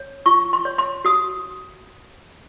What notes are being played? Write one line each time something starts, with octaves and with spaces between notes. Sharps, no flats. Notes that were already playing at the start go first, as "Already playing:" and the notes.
Already playing: C#5
F4 C#6
C6
C#5
C6
F#4 D#6